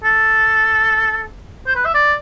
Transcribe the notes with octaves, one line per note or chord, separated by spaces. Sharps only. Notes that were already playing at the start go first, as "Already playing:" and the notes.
A4
C5
B4
E5
D5